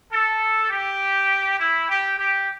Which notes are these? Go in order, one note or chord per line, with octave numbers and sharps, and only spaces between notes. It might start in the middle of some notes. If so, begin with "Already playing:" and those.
A4
G4
E4
G4
G4